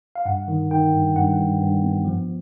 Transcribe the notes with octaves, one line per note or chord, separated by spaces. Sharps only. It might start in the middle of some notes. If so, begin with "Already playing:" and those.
F5
G2 F#5
D#3
D#3 G5
G2
G2 F#5
G2
G2
B3
F3